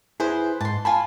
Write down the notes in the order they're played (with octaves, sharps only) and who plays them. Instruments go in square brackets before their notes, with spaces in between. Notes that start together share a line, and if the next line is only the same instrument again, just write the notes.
[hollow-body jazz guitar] E4 G#4 [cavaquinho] B4 C5
[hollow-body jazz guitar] G#2 [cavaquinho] A5 C6
[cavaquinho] F4 G#5 B5 [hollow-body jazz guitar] A5